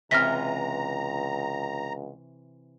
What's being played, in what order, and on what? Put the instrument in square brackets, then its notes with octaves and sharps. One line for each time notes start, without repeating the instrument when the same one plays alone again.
[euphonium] C#2 [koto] C3 E3 [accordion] A#5 [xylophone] F6 A#6 B6